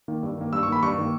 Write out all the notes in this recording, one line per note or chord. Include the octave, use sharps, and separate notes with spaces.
D#3 A#3
G2
D#3 A#3
G2 E6
C#6
D#3 A#3 B5
G2 C#6
D#3 A#3